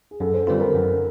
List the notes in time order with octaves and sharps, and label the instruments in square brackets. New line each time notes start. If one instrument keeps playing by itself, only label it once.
[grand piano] G#4
[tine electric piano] F#2 [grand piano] A4
[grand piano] C5
[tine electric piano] D3 G3 C4 F4 [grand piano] B4
[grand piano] A#4
[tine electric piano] F#2